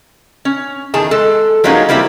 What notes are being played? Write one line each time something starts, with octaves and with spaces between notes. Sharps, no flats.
C#4
E2 D#3 G#4 A5
G#3 A4
F3 F#3 G#3 A#3 C#4 D#4
G3 A#3 C4 E4 F#4 G4